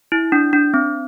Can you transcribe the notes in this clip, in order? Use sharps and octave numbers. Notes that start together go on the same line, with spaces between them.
E4
D4
D4
C4